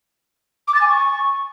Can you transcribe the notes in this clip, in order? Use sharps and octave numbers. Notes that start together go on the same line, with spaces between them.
D6
A6
G#5
C#6